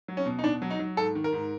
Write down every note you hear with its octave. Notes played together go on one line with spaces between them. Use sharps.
F#3
C#4
B2
D#4
B2 D4
F#3
D#4
F#3
G#2 A4
D#3
A#4
G#2